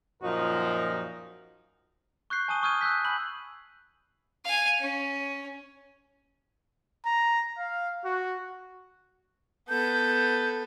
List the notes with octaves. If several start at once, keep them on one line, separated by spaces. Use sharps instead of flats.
F#2 A#2 F3 D#4 F#4 A#4
C#6 F#6 G6 C7
G#5 A5 C#6 D#6 D#7 G7
C#6 D#6 F6 G6 G#6 D#7
E6 F#6 G6 B6
G#5 B5 E6 F#6 F#7
F5 G#5
C#4
A#5
F5
F#4
B3 A4 G6